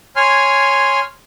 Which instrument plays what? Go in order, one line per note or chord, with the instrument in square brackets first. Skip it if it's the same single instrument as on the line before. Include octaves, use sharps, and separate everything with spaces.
[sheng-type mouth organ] C#5 G#5 C6 F6